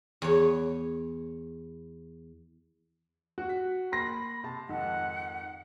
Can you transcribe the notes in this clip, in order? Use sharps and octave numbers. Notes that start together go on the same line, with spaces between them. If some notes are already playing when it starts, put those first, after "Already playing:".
E2 C#5
F#4
B6
A#3 B5 C6 A#6
C3 A5
F2 G#2 D#3 F#5